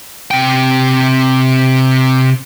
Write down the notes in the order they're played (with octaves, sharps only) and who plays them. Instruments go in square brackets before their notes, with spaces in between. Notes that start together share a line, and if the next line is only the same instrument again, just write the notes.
[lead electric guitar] C3 G5